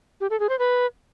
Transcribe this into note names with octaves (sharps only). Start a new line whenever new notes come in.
G4
A4
G#4
C5
B4